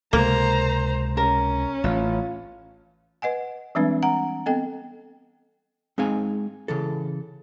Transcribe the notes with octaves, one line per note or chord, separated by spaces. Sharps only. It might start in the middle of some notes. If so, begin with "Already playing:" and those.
C#2 C3 G#3 A#3 C5 A#5
C#4 A#4
A1 F4
B4 D#5 F#5 G#5
E3 G3 G#3 C4 D4 B4
F#5 A#5
B3 C4 A4 D#5 G5
G#3 C4 D#4 F5 G#5
C#3 E3 A4